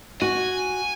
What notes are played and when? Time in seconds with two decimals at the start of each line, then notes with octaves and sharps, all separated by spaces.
0.22 F#4 G#5